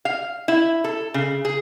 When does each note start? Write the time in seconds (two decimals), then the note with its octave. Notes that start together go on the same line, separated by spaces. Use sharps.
0.05 F5
0.48 E4
0.84 A4
1.14 C#3
1.45 G#4